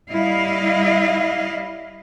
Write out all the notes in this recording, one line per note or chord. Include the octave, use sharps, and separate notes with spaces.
G3 E4 D#5 F5